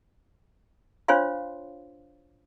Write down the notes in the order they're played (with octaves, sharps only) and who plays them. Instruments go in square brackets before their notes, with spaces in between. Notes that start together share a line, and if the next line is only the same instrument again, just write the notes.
[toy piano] D4 F4 C5 C#5 F5 C6